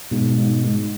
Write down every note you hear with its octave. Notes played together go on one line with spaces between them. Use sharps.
G#2 B2
G#2
G#2